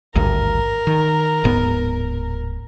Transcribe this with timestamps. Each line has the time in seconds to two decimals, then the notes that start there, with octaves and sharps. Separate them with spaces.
0.15 G#1 D2 G2 A#4
0.87 D#3
1.44 D1 G#2 B3